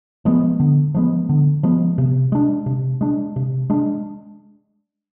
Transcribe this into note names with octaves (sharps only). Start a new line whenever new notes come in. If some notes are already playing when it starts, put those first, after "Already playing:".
F3 G#3 B3
D3
F3 G#3 B3
D3
F3 G#3 B3
C3
G#3 D4
C3
G#3 D4
C3
G#3 D4